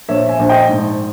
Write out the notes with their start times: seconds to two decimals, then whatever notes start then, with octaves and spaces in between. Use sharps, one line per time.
0.09 A#1 C#5 E5
0.29 E5 G#5
0.39 A#1
0.49 D#5 G5
0.69 G#2